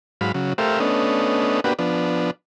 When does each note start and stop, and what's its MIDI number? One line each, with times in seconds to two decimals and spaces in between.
0.21 0.32 44
0.21 0.32 54
0.21 0.32 77
0.21 0.32 83
0.34 0.53 49
0.34 0.53 54
0.58 0.80 57
0.58 0.80 67
0.58 0.80 70
0.58 0.80 72
0.58 0.80 76
0.58 0.80 77
0.80 1.60 57
0.80 1.60 59
0.80 1.60 61
0.80 1.60 62
0.80 1.60 75
1.64 1.73 58
1.64 1.73 59
1.64 1.73 62
1.64 1.73 66
1.64 1.73 67
1.64 1.73 71
1.79 2.31 53
1.79 2.31 59
1.79 2.31 62